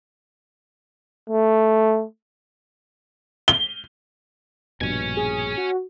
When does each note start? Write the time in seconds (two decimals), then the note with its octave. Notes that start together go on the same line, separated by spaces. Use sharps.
1.30 A3
3.48 G7
4.81 A#1 G2 B2 C#5 G#5
5.17 G#4
5.57 F#4